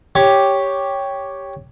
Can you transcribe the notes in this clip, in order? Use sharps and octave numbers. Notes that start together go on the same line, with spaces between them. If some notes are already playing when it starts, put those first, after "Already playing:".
G4 C#5